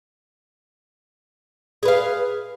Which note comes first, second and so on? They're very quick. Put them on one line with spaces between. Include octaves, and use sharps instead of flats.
G#4 B4 F5